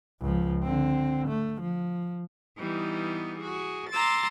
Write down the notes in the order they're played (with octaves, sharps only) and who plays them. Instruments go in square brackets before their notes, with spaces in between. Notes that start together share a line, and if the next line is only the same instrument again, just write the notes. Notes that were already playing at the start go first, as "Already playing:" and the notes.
[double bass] C#2 F3
D3 C4
A3
F3
[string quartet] E3 G3 B3 D#4
F#4 G#4
A#5 C6 D6 E6 A6